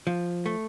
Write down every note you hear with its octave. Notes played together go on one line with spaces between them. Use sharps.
F3
A3